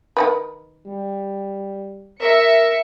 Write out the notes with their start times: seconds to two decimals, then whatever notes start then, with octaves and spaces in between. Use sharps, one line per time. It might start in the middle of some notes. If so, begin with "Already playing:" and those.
0.17 D#3 A#3 B4
0.86 G3
2.21 A#4 E5 C#7